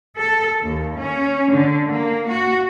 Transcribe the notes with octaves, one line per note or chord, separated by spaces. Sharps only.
A4
D#2
C#4
D3
A#3
F#4